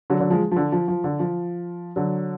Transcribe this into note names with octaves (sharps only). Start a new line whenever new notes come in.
D3 F#3
D3 F#3
F3 G#3
F3
D3
F3
F3
D3
F3
D3 F#3